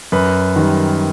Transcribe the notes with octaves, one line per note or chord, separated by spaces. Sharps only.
F#2 B4
D#3 G3